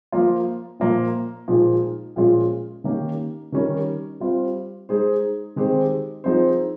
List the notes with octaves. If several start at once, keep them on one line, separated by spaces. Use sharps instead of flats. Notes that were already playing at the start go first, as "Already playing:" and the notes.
F3 A#3 F4
A#2 F3 A#3 F4
A#2 F3 G#3 D#4
A#2 F3 G#3 C#4 F4
D#3 A#3 C#4 G4
D#3 G3 C#4 G4 A#4
G3 C4 F4 C5
G#3 D#4 G#4 C5
D#3 G#3 C4 G4 C5
F3 C4 D#4 G#4 C5